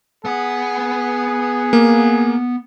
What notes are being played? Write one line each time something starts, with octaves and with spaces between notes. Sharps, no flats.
B3 G#4 F#5
A#3